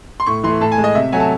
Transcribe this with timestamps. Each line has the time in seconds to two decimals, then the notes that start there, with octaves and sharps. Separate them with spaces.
0.20 C6
0.26 A2 C#6
0.44 E3 A3 C6
0.61 A2 A5
0.72 G#5
0.78 G#3
0.84 D#5
0.95 C3 E5
1.12 F#3 A3 G#5
1.20 A5